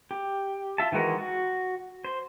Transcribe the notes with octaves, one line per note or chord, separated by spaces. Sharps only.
G4
F4 E5 A5
D#3 E3 G#3 F#4 A#4
F#4
C5